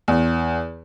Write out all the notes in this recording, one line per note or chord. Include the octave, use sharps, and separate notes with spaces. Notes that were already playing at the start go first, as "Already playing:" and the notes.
E2